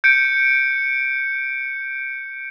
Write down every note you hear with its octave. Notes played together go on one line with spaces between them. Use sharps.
G6 C#7 D7